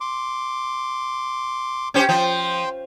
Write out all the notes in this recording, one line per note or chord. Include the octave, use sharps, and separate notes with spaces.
C6 D6
C#4 G4 C5
F3 G5 C6